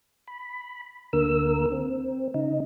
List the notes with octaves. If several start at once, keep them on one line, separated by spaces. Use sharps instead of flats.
B5
D2 D3 A#3 A#4 E6
C4
C#3 D#4